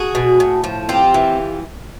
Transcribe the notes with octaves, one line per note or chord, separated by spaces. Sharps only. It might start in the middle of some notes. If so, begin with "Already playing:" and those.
Already playing: F#4 G#4
B2
A2
F3
C4 F4 G4
E3